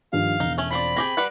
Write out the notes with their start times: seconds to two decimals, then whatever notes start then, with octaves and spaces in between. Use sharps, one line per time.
0.13 G2 D#3 F3 F5
0.40 E1 D#4
0.58 A3 C#4
0.71 F3 C4 D5 B5
0.96 C4 G4 G#4 A#6
1.17 G3 B4 F#5